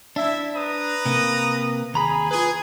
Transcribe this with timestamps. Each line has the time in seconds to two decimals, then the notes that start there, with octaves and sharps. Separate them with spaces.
0.16 D4 E4 E5
0.54 B4 A#5 D#6
1.06 C3 A#3
1.94 D#2 G#4 A#5 B5
2.31 F4 G#4 B4